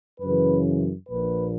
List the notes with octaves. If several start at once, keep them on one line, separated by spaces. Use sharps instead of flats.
F#2 C#3 E3 B4
A#1 A#2 F3 B4